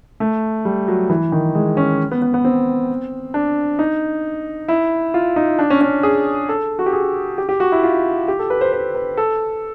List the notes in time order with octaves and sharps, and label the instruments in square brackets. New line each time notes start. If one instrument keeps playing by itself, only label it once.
[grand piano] A3
G3
F#3
E3
D#3
G#3
C#4
B3
B3
B3
C4
D4
D#4
E4
F4
D#4
D4
C#4
C#4
G#4
A4
F#4
G4
G#4
G4
G4
F#4
E4
F4
G4
A4
B4
C5
C5
B4
A4